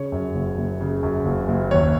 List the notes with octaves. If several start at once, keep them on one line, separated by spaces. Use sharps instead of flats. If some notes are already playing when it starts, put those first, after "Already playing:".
Already playing: C#3 C#5
F#2
F#1
F#1
C#3
F#2
F#1
F#1
D#2 C#5